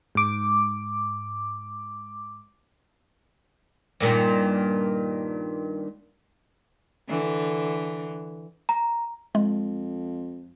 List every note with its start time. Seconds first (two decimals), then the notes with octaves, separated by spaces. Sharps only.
0.15 G#2 D6
4.00 G2 A#2 D#3
7.08 D3 E3
8.69 A#5
9.35 F2 G#3